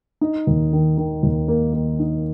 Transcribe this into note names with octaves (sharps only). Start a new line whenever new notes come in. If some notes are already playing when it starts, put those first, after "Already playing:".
D#4
D#2
D#3
D#3
D#2
A#3
A#3
D#4